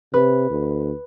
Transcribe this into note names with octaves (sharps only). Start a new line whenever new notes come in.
C3 B4
D2